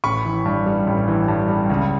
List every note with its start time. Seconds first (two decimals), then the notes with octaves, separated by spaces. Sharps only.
0.04 A1 B5 C#6
0.25 E3
0.45 G2
0.66 G3
0.87 A1
1.08 E3
1.28 G2
1.49 G3
1.70 C#2